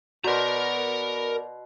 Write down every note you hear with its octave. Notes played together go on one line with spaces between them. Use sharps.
B2 B3 F#4 A#4 D5 A#5 C6